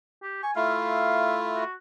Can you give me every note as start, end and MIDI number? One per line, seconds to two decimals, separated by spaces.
0.23 0.39 67
0.43 0.52 80
0.43 0.51 85
0.56 1.64 57
0.56 1.64 64
0.56 1.64 65
0.56 1.38 77
1.56 1.72 66